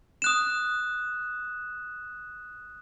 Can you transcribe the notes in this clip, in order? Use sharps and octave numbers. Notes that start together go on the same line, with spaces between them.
D#6 F#6 E7